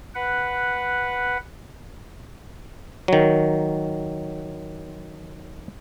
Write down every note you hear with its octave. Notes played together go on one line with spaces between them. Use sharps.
B4 F#5
D#3 F#3